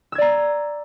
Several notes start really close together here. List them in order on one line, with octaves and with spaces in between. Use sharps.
E6 G#6 D5 A#5